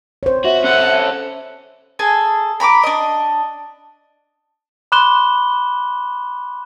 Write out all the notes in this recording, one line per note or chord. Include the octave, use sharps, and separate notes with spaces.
C5 C#5
F#4 E5
C#4 A4 F#5
G#4 A4 G#5
A#5 B5 C#6 D6
D4 D#5
B5 C6 D6 F#6 E7 G7